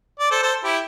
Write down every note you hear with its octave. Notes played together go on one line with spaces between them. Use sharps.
D5
A4 C5
A4 C5
E4 G4